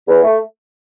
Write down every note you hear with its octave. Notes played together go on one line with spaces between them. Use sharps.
E2
A3